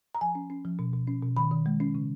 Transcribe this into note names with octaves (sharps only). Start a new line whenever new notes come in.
A#5
F3 G#5
C#4
C#4
F3
B2
B2
C#4
B2
D#3 B5
D#3
G#3
C#4
C#3